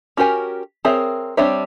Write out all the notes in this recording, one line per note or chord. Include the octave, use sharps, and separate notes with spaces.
C#4 F#4 G4 A#4 G#5
C4 G#4 A#4 C#5 E5
G3 C4 D4 C#5 E5